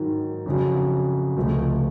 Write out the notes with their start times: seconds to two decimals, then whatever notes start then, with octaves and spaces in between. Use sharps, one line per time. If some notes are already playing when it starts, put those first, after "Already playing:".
Already playing: G#2 D#3 F#3
0.46 F2 C#3 F#3
1.37 C#2 C3 F3 A3